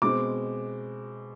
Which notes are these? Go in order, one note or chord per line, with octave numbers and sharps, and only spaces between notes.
B2 G#3 C4 D6